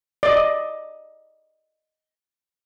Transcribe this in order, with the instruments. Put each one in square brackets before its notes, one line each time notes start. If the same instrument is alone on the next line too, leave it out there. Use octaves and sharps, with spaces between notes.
[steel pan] D5 D#5